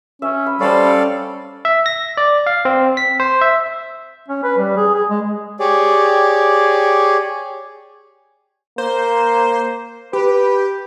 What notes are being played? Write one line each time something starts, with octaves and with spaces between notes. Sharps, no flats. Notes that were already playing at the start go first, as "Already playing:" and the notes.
C#4 E5
B5
G3 C#4 A4 C5 D5 F5
E5
A#6
D5
F5
C4
B6
C5
E5
C#4
B4
G3
G#4
G#4
G#3
G4 G#4 C#5 D5
A#3 C5
G4 B4